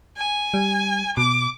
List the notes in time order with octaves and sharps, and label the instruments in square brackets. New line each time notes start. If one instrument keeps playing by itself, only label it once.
[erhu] G#5
[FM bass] G3
[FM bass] B2 [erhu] D6